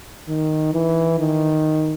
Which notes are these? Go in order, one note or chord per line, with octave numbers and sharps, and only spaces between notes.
D#3
E3
D#3